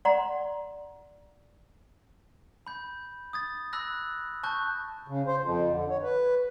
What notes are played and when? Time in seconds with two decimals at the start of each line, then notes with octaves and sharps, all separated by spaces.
0.05 D5 F#5 A#5 C6
2.67 B5 G6
3.33 D#6 G#6 A6
3.73 B5 E6 F#6 A#6
4.43 A5 C#6 F#6 G6
5.08 C#3
5.27 C5
5.41 F2
5.70 D3
5.90 C#5
6.02 B4